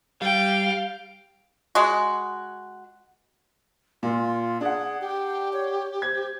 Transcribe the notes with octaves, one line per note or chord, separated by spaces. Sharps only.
G3 F5 G5
G#3 F#4
A#2 F4
D4 G#4 F#5
G4 G5
C#5
C5 G#6